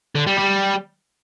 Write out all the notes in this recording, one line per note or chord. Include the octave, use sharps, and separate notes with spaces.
D3
G3
G3